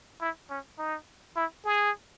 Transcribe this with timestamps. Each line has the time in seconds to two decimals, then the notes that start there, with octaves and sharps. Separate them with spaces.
0.21 E4
0.50 C#4
0.78 D#4
1.36 E4
1.65 G#4